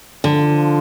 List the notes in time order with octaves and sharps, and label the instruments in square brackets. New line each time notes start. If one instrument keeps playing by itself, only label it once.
[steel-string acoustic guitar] D3 [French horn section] F3